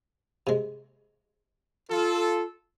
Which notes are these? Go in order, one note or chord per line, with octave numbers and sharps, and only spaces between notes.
C3 G#3
F4 A4